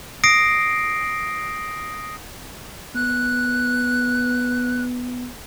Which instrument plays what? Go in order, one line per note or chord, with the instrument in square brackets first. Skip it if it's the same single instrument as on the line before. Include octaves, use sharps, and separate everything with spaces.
[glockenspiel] D#6 A#6 C7 D7
[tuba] B3 [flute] F#6